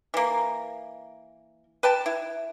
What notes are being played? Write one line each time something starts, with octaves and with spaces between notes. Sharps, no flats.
E3 A#3
B4 G5 A5
E4